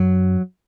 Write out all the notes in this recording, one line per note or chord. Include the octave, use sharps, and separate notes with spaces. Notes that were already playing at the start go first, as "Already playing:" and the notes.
Already playing: F#2 F#3